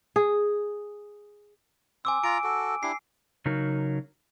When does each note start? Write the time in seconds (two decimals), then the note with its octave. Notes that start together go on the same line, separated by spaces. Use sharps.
0.16 G#4
2.05 C4 G#5 D6 E6
2.24 F4 A#5 D7
2.44 F#4 A4
2.83 D4 E4 G4 C7
3.46 C#3 F#3 D#4 A#4